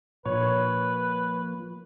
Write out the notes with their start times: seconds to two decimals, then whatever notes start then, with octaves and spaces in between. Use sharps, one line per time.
0.25 A#2 F3 A#3 D4 B4 C#5